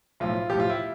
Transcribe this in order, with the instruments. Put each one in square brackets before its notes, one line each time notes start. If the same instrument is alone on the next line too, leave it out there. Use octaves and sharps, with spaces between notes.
[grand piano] B1 A2 F3 F4
B1 A2 F3 G4
F4
E4